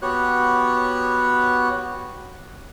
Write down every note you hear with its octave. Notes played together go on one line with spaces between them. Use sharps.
B3 F#4 G4 C#5 F#6